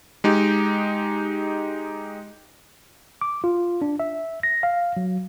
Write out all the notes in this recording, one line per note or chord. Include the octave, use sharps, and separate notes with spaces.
G#3 D#4 G4
D6
F4
D4
E5
A#6
F5
F#3